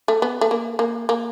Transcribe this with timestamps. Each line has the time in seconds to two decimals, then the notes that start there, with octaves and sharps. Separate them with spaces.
0.08 A3
0.22 B3
0.41 A3
0.51 A#3
0.79 A#3
1.09 A#3